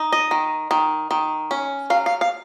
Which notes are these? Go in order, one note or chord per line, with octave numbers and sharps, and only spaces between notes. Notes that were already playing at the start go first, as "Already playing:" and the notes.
Already playing: D#4
D#5
D#3
D#3
D#3
C#4
F#3 F5
F5
F5